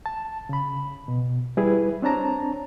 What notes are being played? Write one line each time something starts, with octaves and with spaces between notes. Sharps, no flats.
A5
C#3 B5
B2
G3 E4 G#4 B4
C4 D4 C#5 A5 A#5